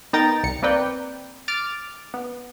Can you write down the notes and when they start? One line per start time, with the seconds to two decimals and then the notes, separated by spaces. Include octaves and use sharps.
0.13 B3 D#4 A#4 G5 A#5 A6
0.44 C2 C#7
0.62 A#3 C4 A#4 B4 D5 G5
1.48 D6 F6 A6 D7
2.14 B3